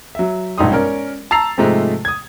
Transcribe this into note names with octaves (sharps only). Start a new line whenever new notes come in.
F#3 E5
E1 A#1 G2 D#4 C6 D#6
C#4 A#4 D5
A5 A#5 E6 A6 C7 F7
G#2 C3 F3 G#3 A3
D#6 G#6